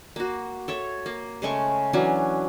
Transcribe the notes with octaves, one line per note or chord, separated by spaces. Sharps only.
A#3 F#4
A4 C#5 E5
A#3
C#3 G#3 A3 C#6
E3 F#3 C#4 D4